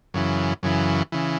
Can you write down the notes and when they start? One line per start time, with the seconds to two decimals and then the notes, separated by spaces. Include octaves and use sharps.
0.14 F#2 C#3 E3
0.63 F#2 C#3 E3
1.12 C#3 E3